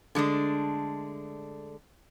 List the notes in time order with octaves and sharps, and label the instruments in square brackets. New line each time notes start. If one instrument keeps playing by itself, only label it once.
[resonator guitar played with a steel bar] D3 G#3 A3 D4